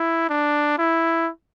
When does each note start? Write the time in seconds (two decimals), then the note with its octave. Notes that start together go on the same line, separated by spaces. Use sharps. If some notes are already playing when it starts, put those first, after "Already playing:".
Already playing: E4
0.29 D4
0.78 E4